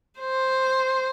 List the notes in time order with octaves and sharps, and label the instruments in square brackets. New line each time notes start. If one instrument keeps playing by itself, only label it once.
[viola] C5